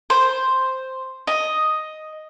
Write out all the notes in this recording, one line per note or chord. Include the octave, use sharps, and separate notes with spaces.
C5
D#5